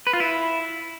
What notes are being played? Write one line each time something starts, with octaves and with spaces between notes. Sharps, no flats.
B4
F4
E4